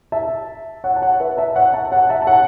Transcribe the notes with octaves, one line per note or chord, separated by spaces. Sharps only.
E5 A5
C#5 F#5
A5
C#5 F#5
B4 E5
E5 A5
C#5 F#5
E5 A5
C#5 F#5
E5 A5
A5
C#5 F#5